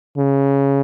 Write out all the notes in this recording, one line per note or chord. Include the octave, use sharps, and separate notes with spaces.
C#3